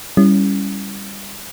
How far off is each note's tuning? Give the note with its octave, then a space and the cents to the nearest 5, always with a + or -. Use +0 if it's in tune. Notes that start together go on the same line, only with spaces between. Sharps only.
G3 +15 C#4 +0 E4 +0